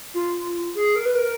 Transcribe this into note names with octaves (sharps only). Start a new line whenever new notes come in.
F4
G#4
A#4
B4
A#4